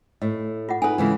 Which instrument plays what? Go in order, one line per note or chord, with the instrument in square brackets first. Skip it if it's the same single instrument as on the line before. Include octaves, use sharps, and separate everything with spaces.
[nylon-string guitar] A2 [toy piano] D#5
[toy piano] F4 D#5 F#5
[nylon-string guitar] D#4 B4 [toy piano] A4 G#5
[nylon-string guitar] C#3 E3 G#3